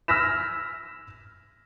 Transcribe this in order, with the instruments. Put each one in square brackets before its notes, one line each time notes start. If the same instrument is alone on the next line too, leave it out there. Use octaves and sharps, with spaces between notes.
[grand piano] E6 F6 A#6 B6 E7